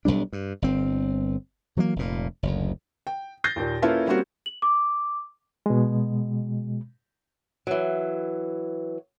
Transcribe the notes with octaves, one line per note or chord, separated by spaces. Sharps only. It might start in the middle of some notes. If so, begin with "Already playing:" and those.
B1 E2 G3 D4
G2
G1 C4
E3 F#3 G#3 A#3
F1 A#2
F#1 D2
G5
G6 A6 A#6 C7
D#2 A#2
A#3 C#4 E4 F4 A4 B4
G3 A#3 C4 C#4 F#4
F#7
D6
B2 G#3
E3 F#3